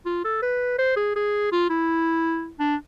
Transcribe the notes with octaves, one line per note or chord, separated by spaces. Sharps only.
F4
A4
B4
C5
G#4
G#4
F4
E4
D4